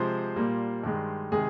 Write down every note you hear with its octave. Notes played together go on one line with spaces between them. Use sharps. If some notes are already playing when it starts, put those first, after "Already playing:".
Already playing: C3 F3 G#3 C5
A#2 G3 A#3
G2 D#3 G#3
C3 D#3 G#3 G#4